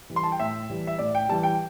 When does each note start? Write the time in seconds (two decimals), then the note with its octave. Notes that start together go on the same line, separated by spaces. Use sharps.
0.10 E3 G3
0.16 C6
0.23 A5
0.32 G5
0.39 A2 E5
0.70 E3 G3
0.87 E5
0.98 A2 D5
1.15 G5
1.29 E3 G3 A5
1.43 G5